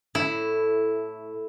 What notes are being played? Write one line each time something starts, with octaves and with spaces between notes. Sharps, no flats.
A2 E4